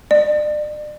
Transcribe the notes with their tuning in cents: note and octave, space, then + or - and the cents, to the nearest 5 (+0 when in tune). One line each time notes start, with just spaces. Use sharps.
D5 +35